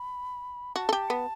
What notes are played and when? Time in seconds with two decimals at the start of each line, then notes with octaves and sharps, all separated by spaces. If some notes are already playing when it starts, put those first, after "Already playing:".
Already playing: B5
0.76 F#4 A5
0.89 A4
0.93 G4
1.10 B3